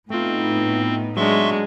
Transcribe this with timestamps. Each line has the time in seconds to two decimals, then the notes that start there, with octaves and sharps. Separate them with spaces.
0.10 A2 A3 B3 C4 D#4 F4
1.17 F#3 G#3 D4 E5 C6 C#6